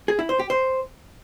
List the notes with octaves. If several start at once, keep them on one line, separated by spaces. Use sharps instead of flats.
G#4
E4
C5
G4
C5